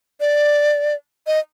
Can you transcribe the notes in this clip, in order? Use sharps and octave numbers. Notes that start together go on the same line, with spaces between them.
D5
D#5